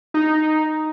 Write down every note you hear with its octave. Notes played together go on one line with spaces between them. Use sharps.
D#4